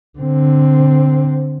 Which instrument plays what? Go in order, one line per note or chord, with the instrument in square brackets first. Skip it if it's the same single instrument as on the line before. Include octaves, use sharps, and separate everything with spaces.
[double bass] D3 C4